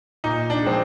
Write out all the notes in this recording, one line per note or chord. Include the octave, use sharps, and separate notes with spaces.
A#2 D#4
D4
F3 G#3 C4